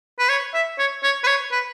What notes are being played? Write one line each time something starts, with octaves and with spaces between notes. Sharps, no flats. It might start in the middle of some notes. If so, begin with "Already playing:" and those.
B4
C#5
E5
C#5
C#5
B4
C#5
B4